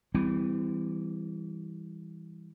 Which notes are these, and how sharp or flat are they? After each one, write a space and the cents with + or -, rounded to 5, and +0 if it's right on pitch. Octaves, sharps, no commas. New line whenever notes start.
E3 -5 G3 +10 C4 -40